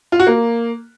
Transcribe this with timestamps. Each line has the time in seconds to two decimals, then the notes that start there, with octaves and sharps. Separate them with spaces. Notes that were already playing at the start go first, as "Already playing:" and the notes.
0.12 F4
0.20 F#4
0.27 A#3